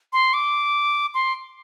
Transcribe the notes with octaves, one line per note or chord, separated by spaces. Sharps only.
C6
D6
C6